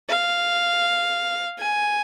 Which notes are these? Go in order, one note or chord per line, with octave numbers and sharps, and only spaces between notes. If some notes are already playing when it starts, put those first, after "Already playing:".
F5
G#5